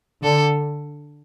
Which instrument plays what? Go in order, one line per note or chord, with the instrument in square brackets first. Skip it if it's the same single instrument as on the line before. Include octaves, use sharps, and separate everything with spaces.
[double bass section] D3 [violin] A4